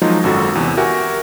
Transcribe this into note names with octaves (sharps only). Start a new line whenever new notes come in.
F3 F#3 G#3 A#3 D#4 F4
G#1 F#2 F#4 A4
E2 C3
F#4 G4 A#4 E5 F#5 G#5